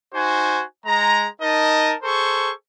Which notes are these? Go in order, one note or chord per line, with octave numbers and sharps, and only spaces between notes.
D#4 F#4 C5 G#5
G#3 A#5
D#4 A#4 D#5 A5
G#4 A4 C5 C#6